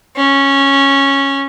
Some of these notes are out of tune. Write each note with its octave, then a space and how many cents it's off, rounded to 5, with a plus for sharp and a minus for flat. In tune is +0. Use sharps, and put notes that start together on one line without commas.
C#4 -5